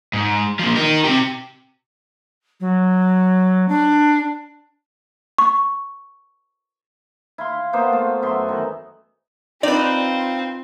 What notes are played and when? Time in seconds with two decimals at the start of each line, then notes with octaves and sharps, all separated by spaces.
0.13 G#2
0.59 A#2 F3
0.76 D#4 A#4
1.04 C3 G4
2.60 F#3
3.68 D4
5.38 C#6
7.38 E4 F5 C6
7.73 A#3 B3 F4 C5
7.90 A3 F4
8.22 F#2 B3 E5 C6
8.48 D#3 E3
9.63 C4 D#4 F4 B4 D5